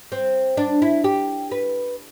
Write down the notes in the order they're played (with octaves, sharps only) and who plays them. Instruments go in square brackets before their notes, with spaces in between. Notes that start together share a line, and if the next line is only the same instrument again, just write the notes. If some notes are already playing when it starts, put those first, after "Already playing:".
[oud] C4
D4
E4
G4
B4